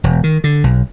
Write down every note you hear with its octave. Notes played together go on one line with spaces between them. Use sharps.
E1
D#3
D3
B1